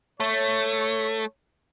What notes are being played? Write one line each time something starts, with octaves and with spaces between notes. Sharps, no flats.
A3 C#5